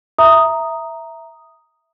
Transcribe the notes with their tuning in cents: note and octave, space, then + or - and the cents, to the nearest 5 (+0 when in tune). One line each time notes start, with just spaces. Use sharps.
E5 +0 A#5 +0 D#6 +0